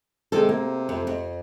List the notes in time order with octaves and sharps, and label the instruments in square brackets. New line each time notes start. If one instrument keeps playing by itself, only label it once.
[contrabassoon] C3 [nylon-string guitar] D#3 G#3 A4
[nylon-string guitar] A#3
F2
F2